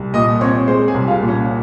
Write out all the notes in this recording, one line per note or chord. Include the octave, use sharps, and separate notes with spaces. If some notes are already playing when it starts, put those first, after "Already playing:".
Already playing: C2
A#2 D#5 D#6
C4 C#5 C#6
G#3 C5 C6
G#4 G#5
C2
F4 F5
A#2
C#4 C#5